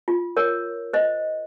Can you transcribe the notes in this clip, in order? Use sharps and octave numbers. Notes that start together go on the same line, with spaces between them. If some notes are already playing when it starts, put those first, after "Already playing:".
F4
A#4 C#5
C5 D#5